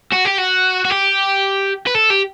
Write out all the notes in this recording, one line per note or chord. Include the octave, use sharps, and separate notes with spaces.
F#4
G4
F#4
F#4
G4
B4
A4
G4